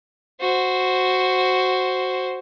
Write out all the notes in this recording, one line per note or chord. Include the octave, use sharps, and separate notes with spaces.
F#4 C5